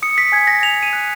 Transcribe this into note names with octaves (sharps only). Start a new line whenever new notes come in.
D#6 C#7
B6
G#5 G#6
A#6
G#5 F7
D#7
F#6